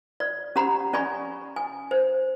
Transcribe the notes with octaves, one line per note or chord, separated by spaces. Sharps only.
D5
C#4 G4 F#5 A#5 B5
C#4 D5 G#5 B5 C#6
G#5
C5